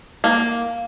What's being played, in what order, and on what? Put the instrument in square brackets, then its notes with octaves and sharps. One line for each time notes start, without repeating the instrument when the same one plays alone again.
[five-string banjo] A#3